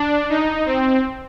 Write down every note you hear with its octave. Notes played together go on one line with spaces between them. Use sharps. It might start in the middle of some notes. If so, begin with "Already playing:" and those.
Already playing: D4
D#4
C4